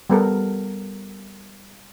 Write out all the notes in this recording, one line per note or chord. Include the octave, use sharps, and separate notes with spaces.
G3 B3 A4 A#4